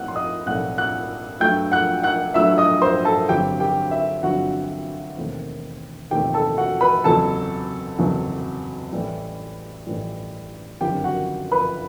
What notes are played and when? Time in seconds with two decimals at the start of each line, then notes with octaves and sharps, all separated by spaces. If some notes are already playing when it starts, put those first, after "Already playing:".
Already playing: B1 A2 G3 C4 F#5 F#6
0.08 C6
0.16 D#5 D#6
0.46 B1 A2 G3 C4 F#5 F#6
0.78 F#5 F#6
1.40 G2 F#3 A3 G5 G6
1.72 F#5 F#6
2.03 F#5 F#6
2.34 G2 F#3 A3 E5 E6
2.58 D#5 D#6
2.82 C5 C6
3.05 A4 A5
3.29 G1 G2 F#3 C4 G4 G5
3.60 G4 G5
3.91 E5
4.23 G1 G2 F#3 C4 F#4 F#5
5.16 E1 D#2 D#3 A3 C4
6.11 E1 D#2 D#3 A3 C4 G4 G5
6.34 A4 A5
6.57 F#4 F#5
6.81 B4 B5
7.04 F#1 E2 C3 F#3 A4 A5
7.99 F#1 E2 C3 F#3
8.93 A1 A2 E3 G3
9.87 A1 A2 E3 G3
10.81 G1 F#2 D#3 F#3 C4 G4 G5
11.04 F#4 F#5
11.52 B4 B5